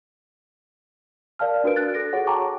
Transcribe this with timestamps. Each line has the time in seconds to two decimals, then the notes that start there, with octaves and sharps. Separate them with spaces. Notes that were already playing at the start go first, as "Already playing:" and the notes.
1.39 A#4 D5 F5 A5 F6
1.64 D4 F#4 A#4 B4 D7
1.76 D4 F#6 A6
1.94 A4 A#6 D7
2.13 F#4 G#4 C#5 F#5
2.27 G5 A5 A#5 C#6 D6